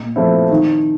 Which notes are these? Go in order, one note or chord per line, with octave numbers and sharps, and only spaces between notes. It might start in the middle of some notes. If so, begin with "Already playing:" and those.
Already playing: A#2
F3 A3 C4 E4
D#3